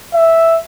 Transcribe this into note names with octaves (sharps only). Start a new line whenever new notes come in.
E5